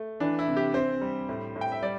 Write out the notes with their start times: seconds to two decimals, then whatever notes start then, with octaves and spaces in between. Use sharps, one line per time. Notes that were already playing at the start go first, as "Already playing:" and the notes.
Already playing: A3
0.20 E3 D4
0.39 E4
0.48 C3
0.57 G4
0.74 C4 C5
1.01 G3
1.29 A2
1.56 A2
1.61 G5
1.72 E5
1.82 G3 D5